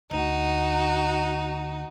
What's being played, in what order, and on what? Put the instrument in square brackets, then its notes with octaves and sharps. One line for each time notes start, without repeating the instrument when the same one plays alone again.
[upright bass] D2 [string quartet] D#4 F#4